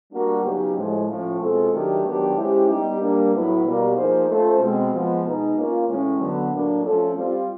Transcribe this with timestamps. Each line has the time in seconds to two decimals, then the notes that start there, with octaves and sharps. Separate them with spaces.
0.12 G3 A#3 D4 F#4
0.44 C#3 F#3 B3 D#4 G4
0.76 A2 F3 G#3
1.08 A2 F3 A3 C#4 F4
1.40 B2 G#3 C4 F4 A4
1.72 D#3 F#3 A3 D4 G4
2.04 D#3 F#3 B3 D4 G4
2.36 G#3 C#4 E4 G4 C5
2.68 G3 B3 D#4 G4
3.00 G3 A#3 D4
3.32 A2 F#3 B3 E4
3.64 B2 G3 A#3
3.96 F3 A#3 D#4 G#4 C5
4.28 A3 C#4 F4 A4 C5
4.59 B2 G#3 C4
4.92 F3 G#3 B3
5.23 B2 G#3 B3 D#4
5.56 A#3 C#4 F4
5.87 A2 E3 G#3 C#4
6.20 D3 F#3 B3
6.51 A2 F#3 A#3 D4
6.84 F3 A3 C#4 F4 A4
7.15 G3 C4 F4